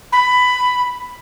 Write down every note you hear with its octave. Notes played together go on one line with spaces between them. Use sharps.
B5